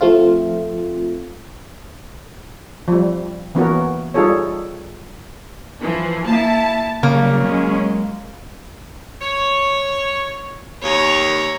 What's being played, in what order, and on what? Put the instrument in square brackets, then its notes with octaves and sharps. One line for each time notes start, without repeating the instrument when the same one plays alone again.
[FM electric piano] F3 A3 C4 F4
[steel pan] F3 G3
E3 A#3 B3 C#4 F#4 A#4
G3 D#4 F4 G#4 A4 C#5
[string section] E3 [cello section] F3
[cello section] A#3 E4 [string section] A5
[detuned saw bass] C#3 [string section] F#3 [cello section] G3 [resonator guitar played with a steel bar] A#3
[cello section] G#3 [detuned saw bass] C#4
[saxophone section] C#5
[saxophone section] D#2 [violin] C#5 A#5